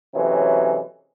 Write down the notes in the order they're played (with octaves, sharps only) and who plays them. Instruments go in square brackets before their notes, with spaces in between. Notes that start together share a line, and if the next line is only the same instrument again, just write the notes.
[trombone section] C3 E3 F#3 G#3 A3 C#4